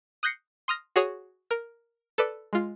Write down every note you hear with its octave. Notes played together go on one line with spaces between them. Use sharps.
D#6 F#6 G6 A#6 C7 C#7
C6 D#6 F6 A#6
F#4 G#4 C#5 C#6 D#6
A#4
A4 B4 D5
G#3 F4